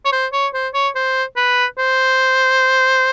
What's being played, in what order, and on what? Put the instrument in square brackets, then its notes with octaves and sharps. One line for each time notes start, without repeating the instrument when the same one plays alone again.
[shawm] C#5
C5
C#5
C5
C#5
C5
B4
C5